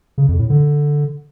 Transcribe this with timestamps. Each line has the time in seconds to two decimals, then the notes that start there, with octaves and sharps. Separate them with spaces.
0.18 C#3
0.28 F2
0.39 A2
0.50 D3